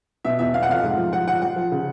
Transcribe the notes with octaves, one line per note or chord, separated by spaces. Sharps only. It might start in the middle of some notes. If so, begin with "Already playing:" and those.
B2 E5
E2 E5
B2 F5
F#5
F1 F5
G#2
F3
F3 F#5
F3 F#5
F3 F#5
F3
C#3